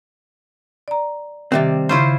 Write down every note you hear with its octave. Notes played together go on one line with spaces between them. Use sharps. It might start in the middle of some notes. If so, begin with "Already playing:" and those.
D5 A#5
C3 D#3 G3 C4 E5 A6
C#3 E4 F4 C5 C#6 G6